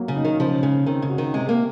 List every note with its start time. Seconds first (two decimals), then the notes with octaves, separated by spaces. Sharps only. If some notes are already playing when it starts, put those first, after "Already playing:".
Already playing: F#3 A#3
0.08 C#3
0.16 D#4
0.25 D#3
0.39 C#3 F3
0.63 C#3 G#3
0.86 D#3 C4
1.02 C#3
1.09 F#4
1.18 D#3
1.33 C3 G#3
1.49 A#3